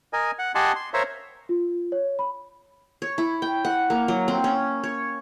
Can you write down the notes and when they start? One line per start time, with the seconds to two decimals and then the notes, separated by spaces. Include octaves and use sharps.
0.13 A#4 D#5 G#5
0.39 F#5
0.55 G4 D#5 F#5 G#5 A5 C6
0.76 C6
0.94 A#4 C5 C#5 E5 F5
1.49 F4
1.92 C#5
2.19 B5
3.02 C#5
3.18 E4
3.42 G5
3.65 F#5
3.90 A#3
4.08 F#3
4.28 C4
4.44 C#4
4.84 C#5